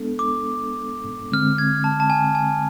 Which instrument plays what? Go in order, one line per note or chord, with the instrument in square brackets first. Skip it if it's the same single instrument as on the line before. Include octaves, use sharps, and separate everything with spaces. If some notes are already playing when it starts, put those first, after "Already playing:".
Already playing: [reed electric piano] G#3 B3 D4 A4
[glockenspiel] D6
[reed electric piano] D3 G#3 C4 [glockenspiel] F6
[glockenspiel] G#6
A5
A5
G#5
G#5